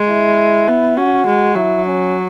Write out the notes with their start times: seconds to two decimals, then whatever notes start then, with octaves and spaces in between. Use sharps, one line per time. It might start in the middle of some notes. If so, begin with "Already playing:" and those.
Already playing: G#3
0.09 E4
0.68 B3
0.97 C#4 F#4
1.27 G#3
1.55 F#3 E4
1.85 C#4